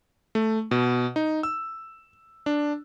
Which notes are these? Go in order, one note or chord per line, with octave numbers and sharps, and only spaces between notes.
A3
B2
D#4
E6
D4